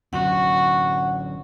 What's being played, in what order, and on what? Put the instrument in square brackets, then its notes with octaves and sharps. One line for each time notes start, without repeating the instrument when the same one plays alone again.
[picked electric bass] D3 F#3 C#4 [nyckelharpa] F#4 [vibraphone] F#5